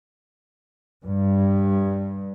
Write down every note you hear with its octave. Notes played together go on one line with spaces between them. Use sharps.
G2